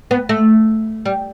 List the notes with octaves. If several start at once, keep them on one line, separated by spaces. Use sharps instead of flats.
B3
A3
G3